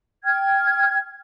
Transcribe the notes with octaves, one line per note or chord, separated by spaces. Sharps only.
G5 F6 G#6